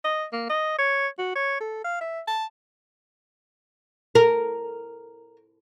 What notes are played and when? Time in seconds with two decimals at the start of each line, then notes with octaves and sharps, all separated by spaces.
0.04 D#5
0.33 A#3
0.49 D#5
0.78 C#5
1.18 F#4
1.35 C#5
1.61 A4
1.84 F5
2.01 E5
2.27 A5
4.15 A#4